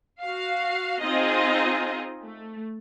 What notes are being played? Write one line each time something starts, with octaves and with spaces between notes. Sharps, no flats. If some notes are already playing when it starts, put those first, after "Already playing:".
F#4 F5
C4 D#4 F4 G#4 D#5
A3